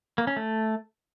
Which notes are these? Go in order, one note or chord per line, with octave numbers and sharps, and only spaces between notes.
A#3
C#4
A3